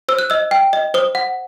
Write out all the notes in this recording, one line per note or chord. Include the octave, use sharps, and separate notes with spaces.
C5 E6
F#6
D#5 E6
G5
D#5
C5 D#6
F#5